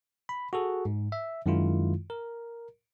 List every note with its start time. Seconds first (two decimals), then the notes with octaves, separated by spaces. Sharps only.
0.29 B5
0.53 F#4 G#4 A4
0.85 G#2
1.12 E5
1.46 F#2 D#3 G#3 E4 F4
2.10 A#4